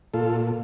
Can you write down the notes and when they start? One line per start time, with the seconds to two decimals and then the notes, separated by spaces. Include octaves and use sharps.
0.14 A#2 F4 A4